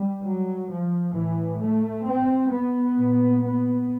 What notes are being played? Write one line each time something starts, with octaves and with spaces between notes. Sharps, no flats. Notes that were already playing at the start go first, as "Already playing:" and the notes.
Already playing: G3
F#3
F3
A2 E3
A3
C4
B3
A#2
B3